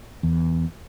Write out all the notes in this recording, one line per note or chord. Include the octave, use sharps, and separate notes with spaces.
E2